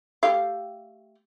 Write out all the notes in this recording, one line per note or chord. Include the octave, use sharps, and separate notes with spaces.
A3 G4 F5